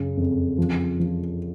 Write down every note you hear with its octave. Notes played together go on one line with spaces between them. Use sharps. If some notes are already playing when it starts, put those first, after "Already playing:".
Already playing: F#2 C#3
F2
F3
F3